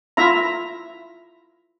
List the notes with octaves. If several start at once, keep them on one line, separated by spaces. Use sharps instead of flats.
E4 F4 E5 A#5